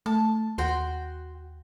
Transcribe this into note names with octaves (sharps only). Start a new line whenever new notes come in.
A3 A5
D#2 F#4 G5 C6